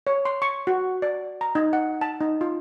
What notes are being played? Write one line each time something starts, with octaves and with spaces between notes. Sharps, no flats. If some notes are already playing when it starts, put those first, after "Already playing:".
C#5
C6
C#6
F#4
D5
A#5
D#4
F#5
A5
D#4
F4